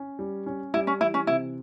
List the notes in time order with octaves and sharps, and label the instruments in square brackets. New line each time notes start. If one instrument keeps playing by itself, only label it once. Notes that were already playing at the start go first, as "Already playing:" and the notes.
Already playing: [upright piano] C#4
G3
C#4
[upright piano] G3 [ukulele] E4
[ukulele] C#4
[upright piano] E3 [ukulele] E4
[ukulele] C#4
[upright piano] C3 [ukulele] E4